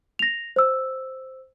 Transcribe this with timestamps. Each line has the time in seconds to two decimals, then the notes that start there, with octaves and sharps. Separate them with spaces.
0.19 A#6 F7
0.56 C5 E6